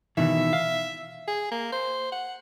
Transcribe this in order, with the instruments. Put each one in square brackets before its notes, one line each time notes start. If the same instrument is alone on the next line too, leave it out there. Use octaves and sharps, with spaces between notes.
[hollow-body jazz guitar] B2 D#3 E3 [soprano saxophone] E5
[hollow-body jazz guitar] F5
[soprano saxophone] G#4
A#3
C5
F#5